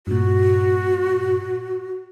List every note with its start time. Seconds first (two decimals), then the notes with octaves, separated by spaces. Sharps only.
0.07 G2 A#2 F#4